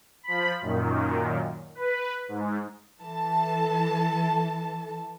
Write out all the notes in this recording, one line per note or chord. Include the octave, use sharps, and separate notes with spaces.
F3 B5
F#2 A#2 D#3
B4
G#2
E3 A4 A5